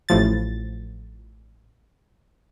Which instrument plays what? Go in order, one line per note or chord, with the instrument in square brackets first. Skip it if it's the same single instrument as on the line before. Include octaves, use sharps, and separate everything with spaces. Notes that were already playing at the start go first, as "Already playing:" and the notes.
[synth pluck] A1 A2 F3 A6